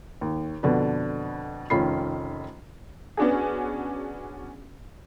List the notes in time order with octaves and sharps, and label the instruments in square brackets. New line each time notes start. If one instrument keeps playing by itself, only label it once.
[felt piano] D#2
F2 B2 D3 D4 B4
F1 D#3 C#4 F4 B5 C7
[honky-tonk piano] B3 C#4 D4 F#4 G#4